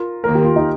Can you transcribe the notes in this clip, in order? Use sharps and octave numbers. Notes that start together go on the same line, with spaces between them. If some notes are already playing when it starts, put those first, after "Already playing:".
Already playing: F4 A#4
D#2 D#3 A#3 A#4
G4
F4
D#4 G4